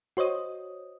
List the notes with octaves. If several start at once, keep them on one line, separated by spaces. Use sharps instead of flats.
F#4 C5 C#5 D#5 D#6